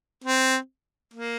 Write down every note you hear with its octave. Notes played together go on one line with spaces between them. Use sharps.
C4
A#3